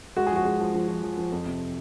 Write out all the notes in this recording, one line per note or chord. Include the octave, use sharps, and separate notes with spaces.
G#3 F#4
F3 G#4
F#4
G#3
F3
F3
F3
F3
F3
F2
C3